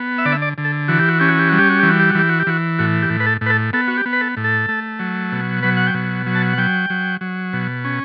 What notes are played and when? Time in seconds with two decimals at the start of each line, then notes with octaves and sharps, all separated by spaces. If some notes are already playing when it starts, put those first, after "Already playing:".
Already playing: B3
0.18 E5
0.25 D3 D5
0.32 E5
0.42 D5
0.58 D3
0.65 A4
0.88 E3 F#4
0.99 G4
1.09 F#4
1.19 C#4 G4
1.29 F#4
1.39 G4
1.49 G3 F#4
1.59 G4
1.70 F#4
1.79 E3 G4
1.89 F#4
1.99 G4
2.09 F#4
2.15 E3 G4
2.29 F#4
2.39 G4
2.47 E3 F#4
2.79 A2 F#4
3.02 G4
3.10 A2
3.20 B4
3.27 A4
3.41 A2 B4
3.50 A4
3.73 B3 A4
3.88 F#4
3.98 G4
4.06 B3
4.13 B4
4.21 A4
4.37 A2
4.44 A4
4.68 A3
4.99 F#3
5.32 B2
5.63 F#3 B4
5.77 F#5
5.87 G5
5.94 B2
6.26 F#3
6.35 A5
6.53 F#5
6.58 F#3 G5
6.90 F#3
7.21 F#3
7.53 B2
7.85 C#4